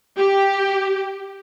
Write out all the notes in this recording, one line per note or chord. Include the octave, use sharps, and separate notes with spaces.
G4